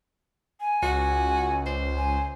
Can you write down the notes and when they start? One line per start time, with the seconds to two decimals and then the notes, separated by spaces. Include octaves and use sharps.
0.60 G#5
0.83 C#2 F#4
1.66 C5
1.97 G#5